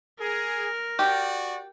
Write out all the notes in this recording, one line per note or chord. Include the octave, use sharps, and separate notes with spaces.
G#4 A#4
F#4 G4 D5